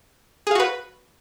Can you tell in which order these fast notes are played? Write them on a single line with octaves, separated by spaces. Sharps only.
G#4 F5 F#4 B4